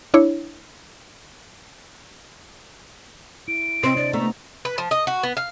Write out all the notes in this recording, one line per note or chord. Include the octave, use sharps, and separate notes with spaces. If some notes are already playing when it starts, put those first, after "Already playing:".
D4 E4 C#5
E4 D7
C3 C4 C5 D#5
D4 D5
A3 B3 A#5
B4
F3
D#5
F#4
B3
F5